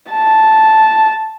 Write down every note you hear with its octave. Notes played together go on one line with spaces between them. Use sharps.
A5